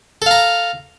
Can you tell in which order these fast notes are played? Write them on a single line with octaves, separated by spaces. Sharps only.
A4 F5 A#5